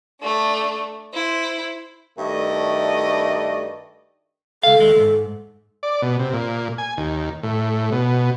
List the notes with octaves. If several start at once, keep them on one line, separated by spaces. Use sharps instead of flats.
A3 D4
E4 C5
G2 D#3 A3 F#4 D5 D#5
C#2 A4 F5
D#2 G#3
D2 G#2
D5
B2
C3
A#2
G#5
D#2
A2
B2